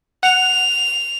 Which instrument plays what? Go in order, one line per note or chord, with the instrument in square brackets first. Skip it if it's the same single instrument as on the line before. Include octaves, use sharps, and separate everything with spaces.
[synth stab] F#5 [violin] F7